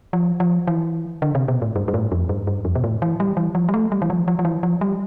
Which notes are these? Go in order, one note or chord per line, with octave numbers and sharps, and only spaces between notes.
F3
F3
E3
D3
C3
B2
A2
G2
G2
A2
F2
G2
G2
F2
B2
A2
E3
G3
E3
F3
G3
A3
G3
E3
F3
F3
F3
E3
F3
G3